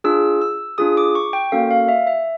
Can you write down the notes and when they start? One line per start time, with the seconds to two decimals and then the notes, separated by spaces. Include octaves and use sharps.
0.04 D4 F4 G#4 E6
0.41 E6
0.78 D4 F4 G#4 D#6
0.97 D6
1.15 C#6
1.33 G5
1.52 A#3 C#4 F#4 A4 F5
1.71 F5
1.88 E5
2.07 E5